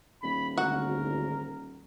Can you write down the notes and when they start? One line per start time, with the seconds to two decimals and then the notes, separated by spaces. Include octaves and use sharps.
0.23 D#1 B5
0.58 G#1 D2 F#4 A#4 F#5